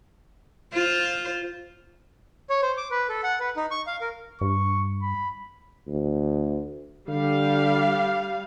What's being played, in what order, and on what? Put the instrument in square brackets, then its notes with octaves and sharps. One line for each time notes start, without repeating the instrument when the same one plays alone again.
[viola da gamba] F4 C5
[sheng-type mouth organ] C#5
C5
D6
B4
A4
F#5
B4
D#4
C#6
F5
A#4
[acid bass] G2 [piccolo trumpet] C#6
[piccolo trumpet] B5
[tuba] D2
[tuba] D3 [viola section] G3 F5